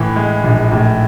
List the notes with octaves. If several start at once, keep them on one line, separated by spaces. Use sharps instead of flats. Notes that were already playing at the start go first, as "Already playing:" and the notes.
Already playing: A2 E3
G#3
A#1
A2